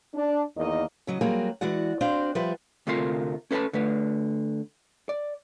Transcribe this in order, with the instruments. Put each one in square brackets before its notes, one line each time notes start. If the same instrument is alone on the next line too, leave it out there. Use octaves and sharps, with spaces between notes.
[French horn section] D4
E2 D#3 A#3 D#5
[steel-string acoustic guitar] C#3 F#3 D#5
F#3 G3 A#3 C4 F#4 G#4
E3 G#3 F#4 D5 F#5
C4 D4 F#4 C5 D5 F5
F3 G3 B4 C5 E5 F#5
[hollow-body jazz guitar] D2 C3 A3 F4 A#4 C6
C#4 A4 B4 F#5 A5 B5
D3 A3 B4
D5